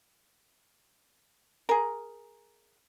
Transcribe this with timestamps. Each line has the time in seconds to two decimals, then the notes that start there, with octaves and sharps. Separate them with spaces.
1.69 G#4 A#4